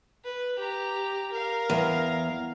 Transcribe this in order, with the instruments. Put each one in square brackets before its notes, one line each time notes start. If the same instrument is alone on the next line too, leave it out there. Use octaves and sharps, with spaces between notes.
[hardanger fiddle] B4
G4 A#5
A#4 F5
[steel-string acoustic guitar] E2